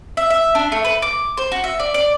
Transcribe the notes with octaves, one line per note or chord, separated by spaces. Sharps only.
E5
E5
D4
A3
B4
D6
C5
F#4
E5
D5
D5